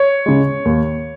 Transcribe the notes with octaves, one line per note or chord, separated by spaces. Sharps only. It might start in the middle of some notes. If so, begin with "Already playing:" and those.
Already playing: C#5
C#3 G#3
D#2